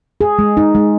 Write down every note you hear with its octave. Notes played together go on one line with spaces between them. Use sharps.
G#4
G#3
D#4
G#3